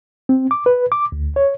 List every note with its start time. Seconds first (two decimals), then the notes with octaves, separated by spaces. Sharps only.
0.29 C4
0.51 D6
0.66 B4
0.92 D6
1.12 D2
1.36 C#5